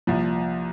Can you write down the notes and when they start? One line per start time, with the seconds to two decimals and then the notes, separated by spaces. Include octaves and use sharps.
0.07 C2 A#2 F3